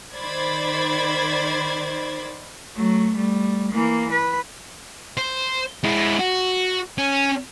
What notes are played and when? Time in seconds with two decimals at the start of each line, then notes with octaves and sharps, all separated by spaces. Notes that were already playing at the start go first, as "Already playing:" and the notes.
0.15 D#3 C5 D5 B5 G#6 A6
2.76 F#3 A3
3.16 G3 A3
3.71 E3 A#3
4.11 B4
5.18 C5
5.84 G#3 E4
6.19 F#4
6.98 C#4